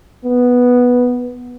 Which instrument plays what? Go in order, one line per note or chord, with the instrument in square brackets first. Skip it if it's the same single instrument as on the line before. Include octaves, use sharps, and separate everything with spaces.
[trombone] B3